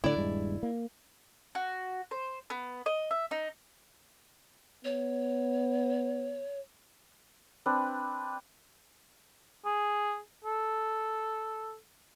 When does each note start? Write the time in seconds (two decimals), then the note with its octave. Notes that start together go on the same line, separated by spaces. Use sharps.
0.04 A2 D3 E4 D5
0.16 D#1 G2 G#3
0.63 A#3
1.55 F#4
2.11 C5
2.50 B3
2.86 D#5
3.11 E5
3.31 D#4
4.84 B3 C#5
7.66 C4 D4 B4
9.65 G#4
10.45 A4